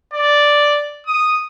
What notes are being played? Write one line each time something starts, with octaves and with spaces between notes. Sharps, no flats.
D5
D#6